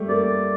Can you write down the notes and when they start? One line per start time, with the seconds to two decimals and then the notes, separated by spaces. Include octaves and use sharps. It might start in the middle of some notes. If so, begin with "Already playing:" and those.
Already playing: G3 A3
0.09 A#3 D5